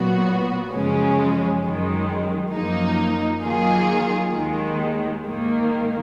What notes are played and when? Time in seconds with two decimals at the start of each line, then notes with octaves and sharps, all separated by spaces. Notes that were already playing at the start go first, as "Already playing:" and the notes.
Already playing: A#2 F#3 B3 F#4
0.72 F#2 C#3 F3 G#3 C#4
1.63 F#2 D#3 G#3
2.53 F#2 F3 A#3 D#4
3.44 D#3 F#3 A#3 F4 G#4
4.34 D#2 D#3 G#3
5.25 G#2 D#3 A#3